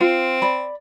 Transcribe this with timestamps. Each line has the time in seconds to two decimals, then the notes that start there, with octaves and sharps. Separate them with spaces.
0.01 C4 F4
0.42 D5 B5